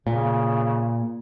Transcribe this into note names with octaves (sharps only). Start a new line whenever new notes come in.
A#2 C#3